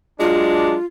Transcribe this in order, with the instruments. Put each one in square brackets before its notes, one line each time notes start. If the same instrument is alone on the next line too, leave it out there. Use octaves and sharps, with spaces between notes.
[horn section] F#3 G#3 D4 [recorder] F4